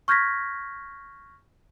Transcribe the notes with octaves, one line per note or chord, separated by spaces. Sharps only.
C#6 F6 G6 G#6 A#6 B6